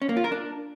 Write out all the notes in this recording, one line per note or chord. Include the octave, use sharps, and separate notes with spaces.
C#4
A#3
F4
A#4
D4